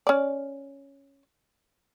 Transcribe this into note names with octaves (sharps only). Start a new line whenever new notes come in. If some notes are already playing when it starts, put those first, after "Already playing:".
C#4 D5